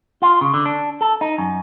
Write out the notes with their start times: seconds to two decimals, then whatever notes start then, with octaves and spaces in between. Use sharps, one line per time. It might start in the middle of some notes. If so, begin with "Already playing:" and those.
0.22 F4
0.41 C#3
0.54 D3
0.66 D4
1.01 A4
1.21 D#4
1.38 F#2